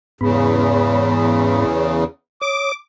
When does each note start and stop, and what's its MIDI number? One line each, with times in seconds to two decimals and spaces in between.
0.21 2.04 40
0.21 1.65 44
0.21 2.04 49
0.21 1.65 59
0.21 1.65 83
2.42 2.72 73
2.42 2.74 86
2.42 2.72 87